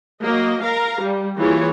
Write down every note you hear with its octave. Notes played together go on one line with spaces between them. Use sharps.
F#3 A#3 D#5
A#4 F5 A#5
G3
E3 A#3 F4 G4 G#4 C#5